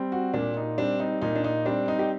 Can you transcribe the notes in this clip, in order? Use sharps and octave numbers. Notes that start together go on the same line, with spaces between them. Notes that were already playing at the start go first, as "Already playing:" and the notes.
Already playing: G3 C4
F#4
A#2 D4
D#4
G3 C4 D4
D#4
A#2 D#4
D4
D#4
G3 C4 D4
D#4
G4